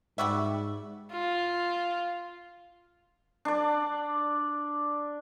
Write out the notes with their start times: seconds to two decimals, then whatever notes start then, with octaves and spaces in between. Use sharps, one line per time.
0.18 G#2 G3 F#4 E5
1.12 F4
3.45 D4 D5